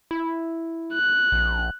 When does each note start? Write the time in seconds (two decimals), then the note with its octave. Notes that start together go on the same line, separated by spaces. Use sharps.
0.11 E4
0.94 F#6
1.32 A#1